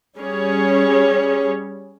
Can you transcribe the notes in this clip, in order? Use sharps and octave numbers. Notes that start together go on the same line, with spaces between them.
G3 C#4 G#4 C#5